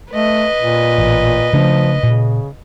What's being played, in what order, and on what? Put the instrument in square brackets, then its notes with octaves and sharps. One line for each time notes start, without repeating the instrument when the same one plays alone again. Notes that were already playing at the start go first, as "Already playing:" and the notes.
[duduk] A3 [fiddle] B4 D#5
[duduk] A#2
[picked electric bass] A1
[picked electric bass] C#3 A3 D4 [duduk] F3
[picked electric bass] A#2 [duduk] C#3